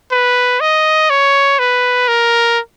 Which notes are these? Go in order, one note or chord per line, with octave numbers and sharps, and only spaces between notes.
B4
D#5
C#5
B4
A#4